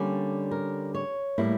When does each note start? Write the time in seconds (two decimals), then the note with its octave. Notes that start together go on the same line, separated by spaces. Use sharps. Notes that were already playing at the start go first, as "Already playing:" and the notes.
Already playing: D3 G3 A#3 C#4 G4
0.51 A#4
0.94 C#5
1.38 A2 G3 A#3 E4